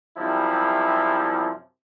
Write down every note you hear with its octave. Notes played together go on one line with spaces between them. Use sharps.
F#2 C3 F3 G3 E4